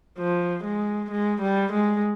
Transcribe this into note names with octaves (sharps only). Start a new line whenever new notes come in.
F3
G#3
G#3
G3
G#3